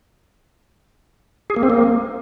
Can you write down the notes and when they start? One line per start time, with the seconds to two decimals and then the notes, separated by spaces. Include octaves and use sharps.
1.50 G#4
1.56 A#3
1.63 C4
1.70 A#3